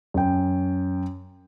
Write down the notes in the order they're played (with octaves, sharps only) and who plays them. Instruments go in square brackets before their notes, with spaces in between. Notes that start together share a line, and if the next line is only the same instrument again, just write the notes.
[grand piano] F#2 G5